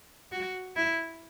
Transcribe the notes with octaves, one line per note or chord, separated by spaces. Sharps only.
F#4
E4